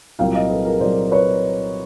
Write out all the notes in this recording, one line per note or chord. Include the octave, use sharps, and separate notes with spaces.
C2 A#2 F#3 A#3 F5 G5
D#5 F5
A4 B4
G#4 A#4
C2 A#2 F#3 A#3 C5 D5
B4 C#5